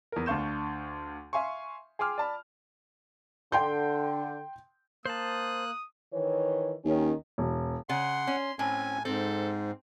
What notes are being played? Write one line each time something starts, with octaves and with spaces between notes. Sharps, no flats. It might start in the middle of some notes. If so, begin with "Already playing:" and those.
E2 A#4
D2 D4 F5 C#6 G6 E7
E5 F5 G#5 C6 C#6
G#4 G5 C6 D6 F6
D5 A5 B5
D3 G5 C6 G6
A#3 C5 A5 D#6 F#6
D#3 E3 C#5
D#2 D#3 C#4
E1
C#3 F#5 C6
C#4
A2 C4 C#4 G#5
G#2 C4 A4